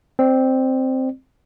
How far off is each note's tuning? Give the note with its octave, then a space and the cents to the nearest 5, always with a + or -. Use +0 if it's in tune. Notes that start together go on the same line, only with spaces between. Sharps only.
C4 +0 D5 +30